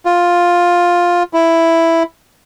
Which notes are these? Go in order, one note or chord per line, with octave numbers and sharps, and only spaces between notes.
F4
E4